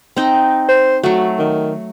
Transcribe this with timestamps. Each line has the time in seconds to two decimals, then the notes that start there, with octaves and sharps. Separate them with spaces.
0.17 C4 D#4
0.69 C5
1.03 F#3 A3 F#4
1.39 D#3